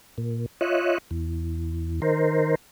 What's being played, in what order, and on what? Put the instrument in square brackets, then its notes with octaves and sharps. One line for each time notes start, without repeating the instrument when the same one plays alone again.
[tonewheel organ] A#2
F4 C#5 D#5 E5 F#6
E2
D#3 A#4 C5